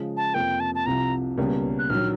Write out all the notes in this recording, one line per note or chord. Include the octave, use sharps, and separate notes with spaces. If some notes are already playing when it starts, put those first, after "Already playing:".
Already playing: C#3 F3 G#3
A5
F2 C3 F3 A#3 G5
A5
A5
C2 C3 F3 A#5
C#2 B2 G3 A#3 C#4
F#6
A#1 D#3 F#3 F6